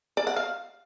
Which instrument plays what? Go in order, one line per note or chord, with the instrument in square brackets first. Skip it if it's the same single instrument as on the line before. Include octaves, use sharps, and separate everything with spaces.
[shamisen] D5
F#5
F5